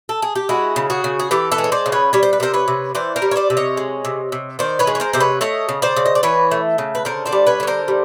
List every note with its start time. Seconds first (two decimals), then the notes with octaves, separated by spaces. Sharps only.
0.09 A4
0.22 G#4
0.35 G4
0.49 G#3 E4 F#4
0.76 C#3
0.90 F#4 G#4
1.04 C#3
1.20 G#4
1.31 E3 G4 A4
1.52 A4 B4
1.58 G#3
1.64 C#5
1.72 C5 D5
1.86 C#3
1.92 B4 C#5
2.13 G3 C#5
2.23 C5
2.33 B4
2.40 C3 A#4 C5
2.54 B4 C#5
2.68 C3
2.95 E3 C5 D5
3.16 A#4 C5
3.22 G3
3.31 C#5
3.36 C5 D5
3.50 C3
3.57 C#5 D#5
3.77 G#3
4.05 C3
4.32 C3
4.59 D#3 C5 D5
4.79 B4 C#5
4.87 G#3
4.95 C#5
5.00 A#4 C5
5.13 C3 C5
5.20 B4 C#5
5.41 A3 C#5 D#5
5.69 C#3
5.82 C5 D5
5.96 C#3
6.06 D#5
6.15 D5
6.23 E3 B4 C#5
6.51 A3
6.78 C#3
6.95 B4
7.05 D3 A#4 C5
7.26 C5 D5
7.32 G3
7.47 B4 C#5
7.60 D3 C#5
7.67 A#4 C5
7.88 G3